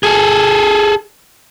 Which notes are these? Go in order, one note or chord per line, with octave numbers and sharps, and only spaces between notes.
G#4 A4